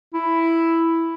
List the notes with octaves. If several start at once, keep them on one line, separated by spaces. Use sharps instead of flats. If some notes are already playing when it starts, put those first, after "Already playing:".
E4